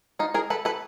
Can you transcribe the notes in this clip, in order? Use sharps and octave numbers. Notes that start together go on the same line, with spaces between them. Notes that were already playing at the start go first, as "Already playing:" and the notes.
D#4 F4
G#4 A#4
A4 B4
A4 B4